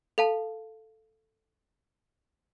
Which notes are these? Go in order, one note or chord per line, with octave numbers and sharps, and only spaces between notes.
A4 F5 A5